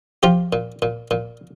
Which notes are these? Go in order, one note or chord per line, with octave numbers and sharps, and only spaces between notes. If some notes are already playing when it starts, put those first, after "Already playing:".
F3 F4 G4
A#2
A#2
A#2